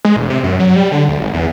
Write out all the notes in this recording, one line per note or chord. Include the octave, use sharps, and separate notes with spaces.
G#3
E1
C3
F#2
F#3
G3
D3
D2
G#1
E2